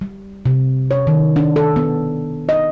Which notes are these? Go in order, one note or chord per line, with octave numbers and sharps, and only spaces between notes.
G3
C3
C#5
D#3
D4
A4
B3
D#5